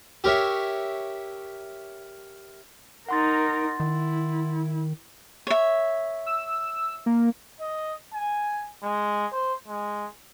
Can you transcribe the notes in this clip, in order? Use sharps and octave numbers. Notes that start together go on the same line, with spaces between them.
G4 A#4 C#5 E5
D#4 A#4 F#5 C6 A6
D#3 E4
C#5 E5
E6
A#3
D#5
G#5
G#3
C5
G#3